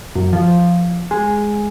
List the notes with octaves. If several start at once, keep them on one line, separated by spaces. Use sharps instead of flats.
F#2
F3
G#3